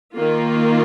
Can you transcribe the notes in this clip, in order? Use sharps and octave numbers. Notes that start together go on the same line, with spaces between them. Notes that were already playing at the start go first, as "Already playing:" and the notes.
D#3 A#3 F4